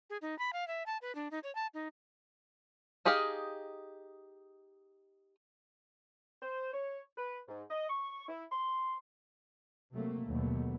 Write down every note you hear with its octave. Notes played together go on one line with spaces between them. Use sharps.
G#4
D#4
B5
F5
E5
A5
B4
D4
D#4
C#5
A5
D#4
D#4 G4 G#4 D#5 F5
C5
C#5
B4
G#2
D#5
C#6
E4
C6
C3 F#3 A3 A#3
D#2 B2 D3 F#3 A3 B3